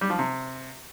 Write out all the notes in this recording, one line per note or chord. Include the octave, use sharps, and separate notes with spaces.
G3
F3
C3